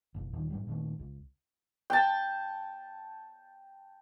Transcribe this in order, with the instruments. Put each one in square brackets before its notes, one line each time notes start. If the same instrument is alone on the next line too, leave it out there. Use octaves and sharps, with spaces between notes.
[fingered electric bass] F#1 B1
D#1 D#3
G#2 F#3 G3
A#2 D#3 A3
C#2
[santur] G5 A5